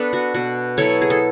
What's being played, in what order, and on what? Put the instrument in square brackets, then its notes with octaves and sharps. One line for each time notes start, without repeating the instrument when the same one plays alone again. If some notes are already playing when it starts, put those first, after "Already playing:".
Already playing: [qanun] B3 D4 A4 B4
F#4
B2 F#4
F#3 B3 E4 A4 C#5
G#4
A4